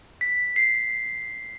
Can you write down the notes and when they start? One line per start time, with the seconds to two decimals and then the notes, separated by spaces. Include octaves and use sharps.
0.21 B6
0.56 C7